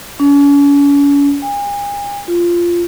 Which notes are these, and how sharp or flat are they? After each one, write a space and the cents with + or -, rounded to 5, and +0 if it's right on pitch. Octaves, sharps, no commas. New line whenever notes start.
C#4 +40
G#5 -40
F4 -10